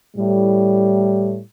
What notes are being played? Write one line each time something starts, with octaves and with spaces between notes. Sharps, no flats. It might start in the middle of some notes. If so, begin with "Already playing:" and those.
A2 G3